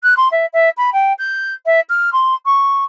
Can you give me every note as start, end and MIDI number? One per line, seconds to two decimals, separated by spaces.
0.03 0.14 90
0.17 0.28 84
0.31 0.45 76
0.53 0.69 76
0.77 0.90 83
0.92 1.13 79
1.18 1.54 91
1.65 1.80 76
1.89 2.12 89
2.12 2.34 84
2.45 2.84 85